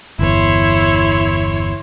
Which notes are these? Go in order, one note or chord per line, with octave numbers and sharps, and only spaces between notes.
G1 E2 E4 C#5 C6